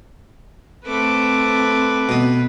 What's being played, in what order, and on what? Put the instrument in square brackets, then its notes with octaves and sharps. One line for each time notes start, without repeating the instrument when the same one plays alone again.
[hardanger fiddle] A3 D6 [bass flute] C4 [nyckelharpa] B4
[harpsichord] B2 D#6